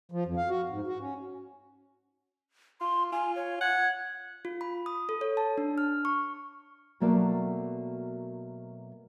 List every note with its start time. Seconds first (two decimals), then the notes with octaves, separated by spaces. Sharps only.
0.12 F3
0.25 F2
0.37 F5
0.49 F#4
0.69 G#2
0.87 F#4
1.01 C#4
2.81 F4 C6
3.12 F4 G#5
3.36 C#5
3.61 F#5 G#6
4.45 F4
4.61 B5
4.86 D#6
5.09 A4
5.21 C#5
5.37 A5
5.58 D4
5.78 F6
6.05 C#6
7.00 B2 F#3 A3 A#3 D5 A5